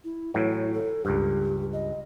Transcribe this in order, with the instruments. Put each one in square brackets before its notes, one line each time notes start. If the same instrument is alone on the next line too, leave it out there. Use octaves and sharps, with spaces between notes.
[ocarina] E4
[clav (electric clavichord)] A2 E3 F#3 [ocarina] E4
[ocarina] A4
[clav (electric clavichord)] C#2 G2 [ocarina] G4
[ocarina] D#5